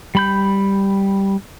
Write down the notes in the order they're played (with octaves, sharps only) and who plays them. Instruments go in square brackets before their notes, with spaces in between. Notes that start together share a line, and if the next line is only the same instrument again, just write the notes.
[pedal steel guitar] G3 B5 G6